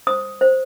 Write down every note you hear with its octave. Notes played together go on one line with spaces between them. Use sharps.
C5 D#6
C5